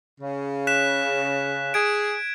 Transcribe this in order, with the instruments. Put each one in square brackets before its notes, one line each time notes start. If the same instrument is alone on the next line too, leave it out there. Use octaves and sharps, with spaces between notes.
[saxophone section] C#3
[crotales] F#6 B6 E7
[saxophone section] G#4 [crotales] G#6 D7